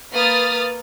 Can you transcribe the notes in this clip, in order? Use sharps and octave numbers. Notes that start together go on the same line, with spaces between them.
A#3 B4 D#6 F6 A6